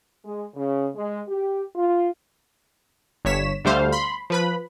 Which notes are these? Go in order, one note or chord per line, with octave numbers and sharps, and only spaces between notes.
G#3
C#3
G#3
G4
F4
G1 G2 C#5 B6 E7
D2 D3 G3 A3 C5 F5
B5 C6
F3 B4 B5